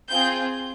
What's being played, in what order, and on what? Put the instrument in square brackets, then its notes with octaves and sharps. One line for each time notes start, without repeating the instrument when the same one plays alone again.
[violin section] C4 F4 G#4 G6